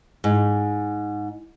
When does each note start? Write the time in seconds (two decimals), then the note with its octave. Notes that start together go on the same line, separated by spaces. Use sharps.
0.24 G#2